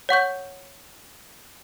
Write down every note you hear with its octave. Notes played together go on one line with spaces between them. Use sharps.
C#5 F#5 C#6 G6